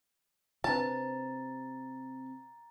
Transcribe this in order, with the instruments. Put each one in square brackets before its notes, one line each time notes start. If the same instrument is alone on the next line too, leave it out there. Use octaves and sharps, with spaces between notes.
[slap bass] C3 [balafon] C4 D4 B4 [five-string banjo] A5 [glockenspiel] A#5 A6